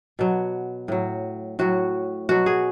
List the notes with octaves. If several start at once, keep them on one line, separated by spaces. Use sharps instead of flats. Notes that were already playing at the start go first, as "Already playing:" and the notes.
B2 F#3
A2 F#3
A2 F#3 F#4
B2 F#3 F#4
G#4